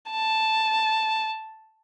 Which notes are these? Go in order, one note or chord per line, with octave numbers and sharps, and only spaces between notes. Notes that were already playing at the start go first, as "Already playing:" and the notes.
A5